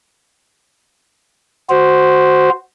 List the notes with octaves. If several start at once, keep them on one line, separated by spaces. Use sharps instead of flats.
F#4 C5